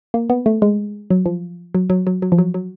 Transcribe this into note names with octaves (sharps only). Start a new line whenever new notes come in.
A#3
B3
A3
G#3
F#3
F3
F#3
F#3
F#3
F#3
F3
F#3
F#3